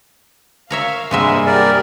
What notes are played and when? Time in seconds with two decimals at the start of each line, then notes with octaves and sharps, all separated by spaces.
0.70 A#4 C#5 E5 F5
1.11 G2 C3 G#3 A#3 E5 F#5 G#5
1.47 G4 G#4 A#4 D5